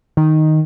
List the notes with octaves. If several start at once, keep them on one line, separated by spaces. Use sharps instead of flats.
D#3